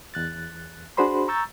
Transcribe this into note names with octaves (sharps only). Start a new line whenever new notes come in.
E2 F#6 A6
D4 F#4 G#4 C5 B5 C6
A#5 C#6 E6 G6 A6